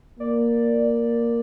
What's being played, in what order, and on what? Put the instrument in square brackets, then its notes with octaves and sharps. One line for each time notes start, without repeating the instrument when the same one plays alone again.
[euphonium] A#3 [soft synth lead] D5